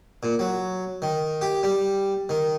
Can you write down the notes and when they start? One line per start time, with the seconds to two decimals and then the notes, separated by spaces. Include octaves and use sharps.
0.23 A#2
0.39 F#3
1.02 D#3
1.41 G4
1.63 G3
2.29 D#3